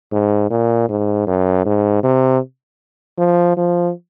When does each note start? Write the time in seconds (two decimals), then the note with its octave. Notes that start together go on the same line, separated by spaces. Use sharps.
0.12 G#2
0.51 A#2
0.89 G#2
1.27 F#2
1.65 G#2
2.04 C3
3.18 F3
3.57 F3